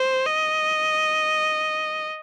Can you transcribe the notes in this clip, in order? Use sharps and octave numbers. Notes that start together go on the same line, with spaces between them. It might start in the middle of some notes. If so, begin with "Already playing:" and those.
Already playing: C5
D#5